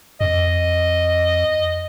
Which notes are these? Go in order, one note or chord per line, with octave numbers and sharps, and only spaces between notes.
F2 D#5